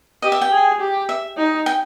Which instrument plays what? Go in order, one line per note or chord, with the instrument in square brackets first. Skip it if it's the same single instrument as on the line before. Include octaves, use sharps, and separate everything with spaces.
[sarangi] G4 [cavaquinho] D#5
[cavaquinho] E5
G5
[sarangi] G#4
G4
[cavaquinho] E5
[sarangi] D#4
[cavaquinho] G5